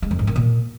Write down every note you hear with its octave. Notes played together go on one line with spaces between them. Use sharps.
G#3
F2
G#2
D#3
A#2